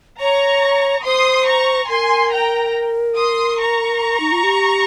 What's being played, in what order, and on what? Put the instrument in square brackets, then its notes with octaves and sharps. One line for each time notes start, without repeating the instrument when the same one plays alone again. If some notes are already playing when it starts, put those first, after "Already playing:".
[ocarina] C#5 [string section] A#5 C#6
[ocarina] C5 [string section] C6 D#6
[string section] A#5 C#6
[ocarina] A#4 [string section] G#5 C6
[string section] G5 A#5
C6 D#6
A#5 C#6
[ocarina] D#4
F4
G4